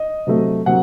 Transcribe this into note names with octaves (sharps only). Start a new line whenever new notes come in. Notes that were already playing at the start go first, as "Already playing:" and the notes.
Already playing: D#5
C3 F#3 A3
C3 F#3 A#3 F#5